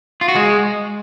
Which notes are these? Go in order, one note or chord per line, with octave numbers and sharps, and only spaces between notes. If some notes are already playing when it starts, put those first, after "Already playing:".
F4
F#4
G#3